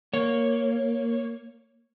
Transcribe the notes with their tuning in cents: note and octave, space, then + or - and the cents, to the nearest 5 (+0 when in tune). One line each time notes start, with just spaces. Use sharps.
A#3 +0 C#5 +0